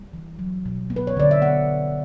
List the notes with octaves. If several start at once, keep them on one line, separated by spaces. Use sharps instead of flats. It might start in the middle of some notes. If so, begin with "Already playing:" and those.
Already playing: G3
E3
F#3
B2
B3
B4
C#5
D3 D5
E5
B3 F#5